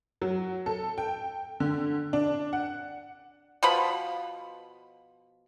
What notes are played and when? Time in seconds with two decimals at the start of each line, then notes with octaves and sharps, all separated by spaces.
0.22 F#3
0.66 A4
0.98 G5
1.60 D3
2.13 D4
2.53 F#5
3.63 B2 F3 B3 B5